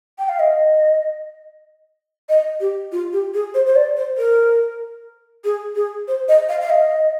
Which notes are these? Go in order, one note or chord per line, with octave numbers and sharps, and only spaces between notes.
G5
F5
D#5
D#5
G4
F4
G4
G#4
C5
C5
D5
C5
A#4
G#4
G#4
C5
D#5
F5
F5
D#5